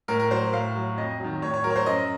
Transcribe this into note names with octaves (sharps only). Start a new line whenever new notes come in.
A2 A#4
A#4
F#3 C5
A2 F5
F#3
F2 D#5
D#3 F#3
A2 C#5
C#5
F#3 A#4
C#5
C5
F#2 D#5